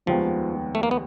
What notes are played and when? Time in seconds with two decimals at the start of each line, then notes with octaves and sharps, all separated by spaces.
0.06 F1 D#2 D#3 F3 G#3 B3
0.75 A3
0.83 A#3
0.91 B3